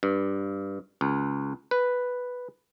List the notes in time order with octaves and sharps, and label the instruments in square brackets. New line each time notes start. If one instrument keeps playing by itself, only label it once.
[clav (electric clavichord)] G2
C#2
B4